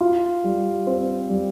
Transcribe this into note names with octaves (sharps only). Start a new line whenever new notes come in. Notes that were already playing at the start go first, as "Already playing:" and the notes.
F4
G3
C4
G3